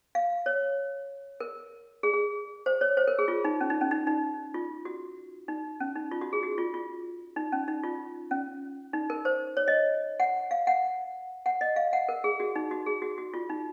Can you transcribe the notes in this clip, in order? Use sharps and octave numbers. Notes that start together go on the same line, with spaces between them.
F5
C#5
A#4
G#4
G#4
C5
C#5
C5
A#4
G#4
F4
D#4
C#4
D#4
C#4
D#4
D#4
F4
F#4
D#4
C#4
D#4
F4
F#4
G#4
F#4
F4
F4
D#4
C#4
D#4
F4
C#4
D#4
A#4
C5
C#5
D#5
F#5
F5
F#5
F#5
D#5
F5
F#5
A#4
G#4
F#4
D#4
F#4
G#4
F#4
F#4
F4
D#4